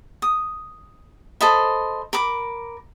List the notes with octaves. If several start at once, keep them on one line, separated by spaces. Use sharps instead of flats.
D#6
A4 C5 D#5 B5
A#4 B5 D6